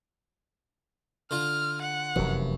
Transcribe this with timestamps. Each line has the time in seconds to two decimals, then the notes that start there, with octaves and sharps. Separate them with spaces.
1.31 D3 F4 F6
1.82 F#5
2.16 F1 F#2 C3 E3